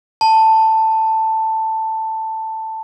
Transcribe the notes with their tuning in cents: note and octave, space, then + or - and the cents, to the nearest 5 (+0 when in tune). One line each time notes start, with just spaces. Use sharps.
A5 +10